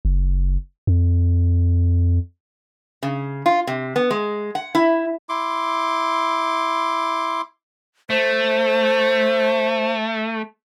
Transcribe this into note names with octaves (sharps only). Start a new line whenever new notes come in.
F#1
F2
C#3
F4
C3
B3
G#3
F#5
E4
E4 C6 D6
A3 C5